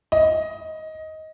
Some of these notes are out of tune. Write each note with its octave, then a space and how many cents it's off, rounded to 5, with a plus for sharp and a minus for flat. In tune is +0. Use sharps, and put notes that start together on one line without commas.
D#5 +15